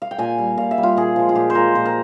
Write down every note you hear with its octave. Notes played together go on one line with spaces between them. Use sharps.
F5
G5
A#2 G#5
G3
A#2 F5
E5
G3
F4
A#2 G#4
F3 G#3
F4
A#2 G4
C5
F3 G#3 A#4
A#2 C5
A#4